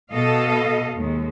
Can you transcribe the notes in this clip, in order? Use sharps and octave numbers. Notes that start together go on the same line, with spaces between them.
B2 A4 D#5 F5
D#2 G#3